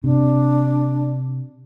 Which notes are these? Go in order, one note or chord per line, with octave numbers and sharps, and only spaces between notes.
C3 D4